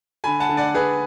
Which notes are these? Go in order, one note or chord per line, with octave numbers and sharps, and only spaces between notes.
D3 G#5 B5
F#5 A5
D3
D5 F#5
D3 G#4 B4